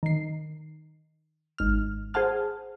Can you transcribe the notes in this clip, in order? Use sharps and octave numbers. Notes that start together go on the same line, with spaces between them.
D#3 C7
G#1 F6
G#4 C5 F#5 A5 F6